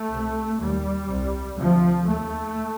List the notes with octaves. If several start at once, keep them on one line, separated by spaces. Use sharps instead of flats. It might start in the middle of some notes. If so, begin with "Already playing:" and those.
Already playing: A3
C2 C3
D#2 G3
C2 C3
D2 C3 F3
D#2 A3